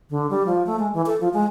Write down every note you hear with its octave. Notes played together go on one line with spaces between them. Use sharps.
D3
G3
F3
A3
G#3
E3
A4
F3
G#3